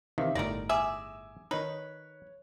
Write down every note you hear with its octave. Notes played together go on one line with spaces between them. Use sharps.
C3 D#3 E3 E5 F5
G1 A2 D#4 A#4 D5 A#6
G#4 E5 G#5 D6 E6
D#3 D#4 B4 C#5